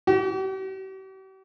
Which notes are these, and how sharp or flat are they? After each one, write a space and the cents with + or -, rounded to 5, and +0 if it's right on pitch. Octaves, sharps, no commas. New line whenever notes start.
G4 -45